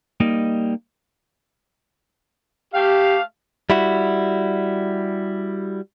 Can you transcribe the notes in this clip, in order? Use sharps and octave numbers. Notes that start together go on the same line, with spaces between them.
G3 A#3 D#4 D#5
A3 G4 F5
G3 E4 F#4